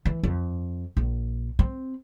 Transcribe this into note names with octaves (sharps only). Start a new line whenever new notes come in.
E3
F2
A#1
C4